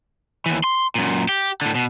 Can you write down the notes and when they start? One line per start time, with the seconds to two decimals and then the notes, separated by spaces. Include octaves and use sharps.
0.46 D#2 E3
0.64 C6
0.95 F#2 A#2
1.29 G4
1.62 A2 D3
1.75 B2